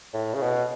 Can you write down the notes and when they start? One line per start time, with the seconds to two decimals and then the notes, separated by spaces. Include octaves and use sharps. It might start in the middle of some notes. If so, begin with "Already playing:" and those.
0.14 A2
0.34 C#3
0.42 B2